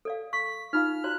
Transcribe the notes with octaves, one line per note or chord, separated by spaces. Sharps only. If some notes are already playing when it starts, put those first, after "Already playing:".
A4 D5 F5
C#6 B6
D#4 F4 F5 F6
F#4 D5 A#5 F#6